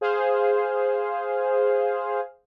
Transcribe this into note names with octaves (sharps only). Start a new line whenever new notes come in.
G#4 C5 F5